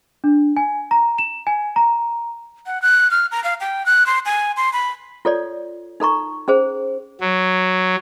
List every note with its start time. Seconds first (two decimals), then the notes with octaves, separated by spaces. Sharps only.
0.24 D4
0.57 G#5
0.91 A#5
1.18 E7
1.47 G#5
1.76 A#5
2.66 F#5
2.82 F#6
3.11 F6
3.32 A#5
3.44 F5
3.60 G5
3.86 F#6
4.06 C6
4.26 G#5
4.57 C6
4.73 B5
5.25 F4 A4 C#5 D5
6.00 D#4 A4 A#5 C#6
6.48 C#4 G#4 C5
7.21 F#3